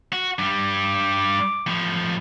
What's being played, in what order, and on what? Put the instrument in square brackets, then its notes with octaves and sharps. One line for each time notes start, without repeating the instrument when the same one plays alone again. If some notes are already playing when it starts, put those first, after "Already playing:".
[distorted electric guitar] F#4
[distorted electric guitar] G2 G3 [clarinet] D6
[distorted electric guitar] A2 F3